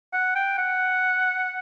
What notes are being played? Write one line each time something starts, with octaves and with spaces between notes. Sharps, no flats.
F#5
G5
F#5